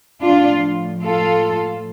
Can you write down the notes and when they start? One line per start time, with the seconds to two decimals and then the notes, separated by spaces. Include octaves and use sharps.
0.21 A2 F3 D4 F4
1.04 F4 A4